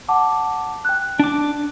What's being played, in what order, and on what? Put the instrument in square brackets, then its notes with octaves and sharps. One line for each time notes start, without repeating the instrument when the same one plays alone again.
[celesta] F#5 A5 D6
G5 F#6
[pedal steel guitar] D4 D6